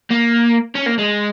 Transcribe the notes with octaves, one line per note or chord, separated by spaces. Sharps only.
A#3
C#4
A#3
G#3